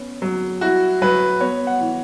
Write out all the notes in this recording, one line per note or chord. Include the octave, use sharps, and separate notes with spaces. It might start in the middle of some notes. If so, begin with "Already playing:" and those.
Already playing: B3 C#4
F#3
E4 F#4
F#3 B4
B3 C#5
F#5
E3